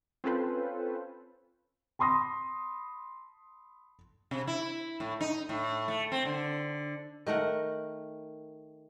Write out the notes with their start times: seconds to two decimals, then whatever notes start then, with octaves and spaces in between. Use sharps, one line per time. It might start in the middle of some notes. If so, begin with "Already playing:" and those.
0.24 C4 C#4 F4 A4 B4 C5
1.99 A5 B5 C6 D#6 A#6
4.31 C3
4.47 E4
5.00 A2
5.21 D#4
5.49 A2
5.88 A3
6.12 C4
6.25 D3
7.27 D#3 A3 A#4 F#5